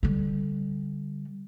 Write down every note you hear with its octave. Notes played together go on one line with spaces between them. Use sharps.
D3 G3